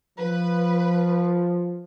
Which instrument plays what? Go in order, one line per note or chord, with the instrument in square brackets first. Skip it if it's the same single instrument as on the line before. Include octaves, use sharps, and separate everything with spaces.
[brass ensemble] F3 [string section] B4